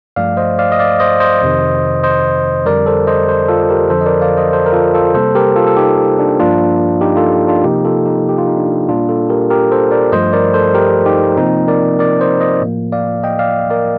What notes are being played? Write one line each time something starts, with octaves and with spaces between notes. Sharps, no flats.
G2 F3 A3 D5 F5
C5 D#5
D5 F5
D#5
D5 F5
C5 D#5
C5 D#5
F2 C3 D#3
C5 D#5
F2 D3 G3 A#4 D5
A4 C5
C5 D#5
A4 C5
F4 A4
G4 A#4
F2 D3 F3 A4 C5
D#5
A#4 D5
D5 F5
C5 D#5
A4 C5
A#4
F4 A4
F4 A4
C3 G3 A#3 A4 C5
G4 A#4
F4 A4
A4
D#4 G4
D4
G2 F3 A#3 D4 F4
D#4 G4
F4 A4
D4 F4
C3 F3 A#3 D#4 G4
F4 A4
D#4 G4
G4
F4
D#4
D4
A#2 G3 A#3 D4 F4
F4 A4
G4 A#4
G4 A#4
A4 C5
A#4 D5
G2 F3 A3 C5 D#5
A#4 D5
A4 C5
G4 A#4
D#4 G4
C3 F3 A#3 C4 D#4
A#4 D5
A#4 D5
C5 D#5
C5 D#5
A2 F3 A#3
D5 F5
D#5 G5
D5 F5
A#4 D5